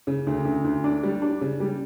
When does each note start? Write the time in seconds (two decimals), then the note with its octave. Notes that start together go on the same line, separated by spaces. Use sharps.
0.07 C#3
0.27 D2
0.45 D2
0.64 D2
0.84 D4
1.03 G3
1.22 D4
1.41 C#3
1.60 G3